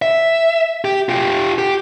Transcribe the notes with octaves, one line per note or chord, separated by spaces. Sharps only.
E5
G4
F4 G4
G4